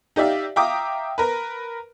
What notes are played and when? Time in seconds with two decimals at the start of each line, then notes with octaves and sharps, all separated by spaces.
0.16 D#4 G4 D5 E5 F5
0.56 E5 F5 G5 A#5 D6 D#6
1.18 A#4 B4